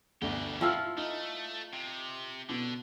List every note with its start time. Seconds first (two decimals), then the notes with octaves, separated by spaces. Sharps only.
0.22 G1 D2 B2 G4
0.61 F3 E4 F4 G5 E6 F6
0.97 A3 D#4
1.73 C3
2.49 B2 D3